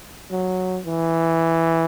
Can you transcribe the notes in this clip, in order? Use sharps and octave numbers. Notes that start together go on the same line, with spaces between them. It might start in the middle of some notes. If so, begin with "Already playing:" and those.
F#3
E3